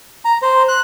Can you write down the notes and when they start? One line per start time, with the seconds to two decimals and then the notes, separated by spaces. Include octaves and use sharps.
0.25 A#5
0.42 C5
0.68 F#6